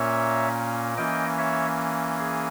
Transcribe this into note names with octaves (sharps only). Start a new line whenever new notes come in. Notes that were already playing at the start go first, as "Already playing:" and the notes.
Already playing: A#2 A#3 C#4 C#5 E5
E3 A#3 C#4 D#5 G5
C#5 E5
G#4